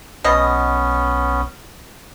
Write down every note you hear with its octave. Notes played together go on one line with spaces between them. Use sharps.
B1 B2 B3 C#4 D#5